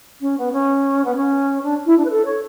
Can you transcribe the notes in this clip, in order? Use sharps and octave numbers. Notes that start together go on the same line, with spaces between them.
C#4
B3
C#4
B3
C#4
D4
E4
D4
B4
A4
C#5